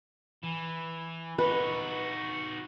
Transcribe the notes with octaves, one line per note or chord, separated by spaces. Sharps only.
E3
D#4 F#4 B4